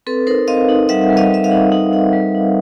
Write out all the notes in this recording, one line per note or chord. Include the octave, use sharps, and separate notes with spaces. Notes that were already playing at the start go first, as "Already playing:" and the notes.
C4 A4 B4
D#4 A#4 C5
C4 D#5 F5
D#4
G3 E5 F#5
G3
D#5 F5
G3 E5
D#5 F5
D#4
D#4
D#4
G3
D#4